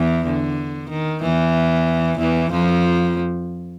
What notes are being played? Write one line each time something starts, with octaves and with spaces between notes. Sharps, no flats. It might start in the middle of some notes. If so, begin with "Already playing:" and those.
Already playing: E2 E3
D3
D#3
E2 E3
E2 E3
F2 F3